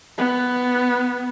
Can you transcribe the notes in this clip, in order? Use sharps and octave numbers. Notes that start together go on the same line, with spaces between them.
B3